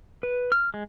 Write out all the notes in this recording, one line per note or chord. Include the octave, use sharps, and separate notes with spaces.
B4
F6
G#3